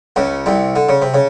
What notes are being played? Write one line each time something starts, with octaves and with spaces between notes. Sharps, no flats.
C#2 C#3
C2 C3
D3
C#3
C3
C#3